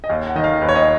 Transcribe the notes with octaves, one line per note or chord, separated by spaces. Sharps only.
D#5
D#2 F5
F#5
D#3 D#5
F5
D#2 B4
C#5
D#5